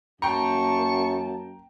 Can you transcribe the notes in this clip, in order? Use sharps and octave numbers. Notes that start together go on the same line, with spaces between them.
F#2 A#3 G5 A5 A#5 C#6